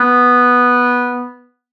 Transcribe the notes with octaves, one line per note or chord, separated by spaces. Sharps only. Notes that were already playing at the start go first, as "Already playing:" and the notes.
Already playing: B3